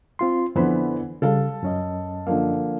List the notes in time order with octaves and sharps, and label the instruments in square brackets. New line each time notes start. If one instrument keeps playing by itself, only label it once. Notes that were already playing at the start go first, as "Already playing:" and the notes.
[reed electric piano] C4 F4 C6
[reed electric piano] F2 C5 B5 [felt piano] D3 E3 B3
[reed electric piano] C#3 G3 [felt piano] A4 F5 A5
[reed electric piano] F#2 C#4 D#5
[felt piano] D3 F3 A#3